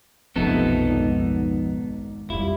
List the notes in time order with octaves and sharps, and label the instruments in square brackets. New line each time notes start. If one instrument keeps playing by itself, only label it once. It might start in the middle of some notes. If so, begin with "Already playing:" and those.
[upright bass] B1 F2 [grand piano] C3 F3 A3 [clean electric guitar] B3 D#4 A4
[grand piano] G#1
[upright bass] F2 D#3 [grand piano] G3 F4 [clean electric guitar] E4